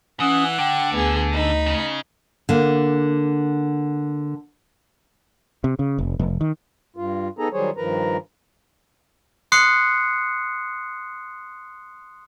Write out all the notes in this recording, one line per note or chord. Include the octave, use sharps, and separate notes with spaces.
E3 C#4 F#5 D#6
D3 G5
D2 B3 G#4
D#4 B5
C#3
D3 A#3
C3
C#3
F1
F1
D#3
G2 F4
B3 D#4 G#4 A4 A#5
D#3 F#3 G3 G#4 C5 C#5
G2 D#3 F3 A#4 B4 A#5
C6 D#6 F#6 C7 C#7